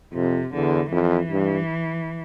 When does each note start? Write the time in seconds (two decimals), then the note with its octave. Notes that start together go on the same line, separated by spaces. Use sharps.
0.14 F2 C3
0.53 E2 D3
0.92 F2 E3
1.31 G2